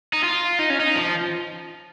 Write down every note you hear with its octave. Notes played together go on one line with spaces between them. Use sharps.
D#4
F4
D#4
C#4
D#4
F3